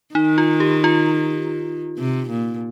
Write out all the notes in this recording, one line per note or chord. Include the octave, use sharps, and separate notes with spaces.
D#3 D#4
F4
G4
F4
C3
A#2